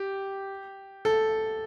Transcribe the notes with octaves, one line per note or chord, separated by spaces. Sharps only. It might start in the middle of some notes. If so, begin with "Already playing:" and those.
Already playing: G4
A4